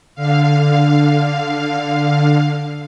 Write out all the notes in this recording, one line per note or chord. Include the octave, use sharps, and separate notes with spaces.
D3 F5